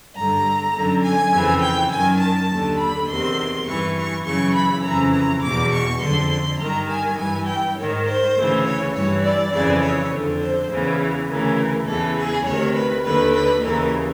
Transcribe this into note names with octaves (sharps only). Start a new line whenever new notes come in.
G2 D3 A#5
F#2 D3
G#5
F2 C#3 E3
G5
F#2 D#3 G#5
A5
D#2 D3
B5
E2 C3 D#3 C6
G2 E3 C#6
C#6
F#2 C#3 E3 C#6
B5
F2 C#3 E3 A#5
A#5
E2 B2 D6
C#6
F2 D3 C6
C6
G2 D#3 A#5
G#5
G2 E3 G#5
G5
G#2 D#3 C#5
C5
D2 C#3 E3
C#5
G2 E3 C#5
D5
F2 C#3 E3 D5
C#5
F2 D3
C5
E2 C#3 E3
D2 C#3 E3 A#4
E2 C#3 E3 A4
G#4
D2 C3 D#3 C#5
B4
D#2 D3 B4
B4
D#2 C#3 E3 A#4